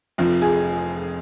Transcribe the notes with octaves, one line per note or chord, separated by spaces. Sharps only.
F1 F2 F3
G#4